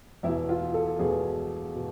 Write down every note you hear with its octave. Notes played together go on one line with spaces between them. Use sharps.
E2 B2 E4
F4
A4
E2 B2 G#4
B2